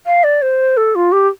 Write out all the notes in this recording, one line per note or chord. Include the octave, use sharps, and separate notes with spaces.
F5
D5
C5
A4
F4
G4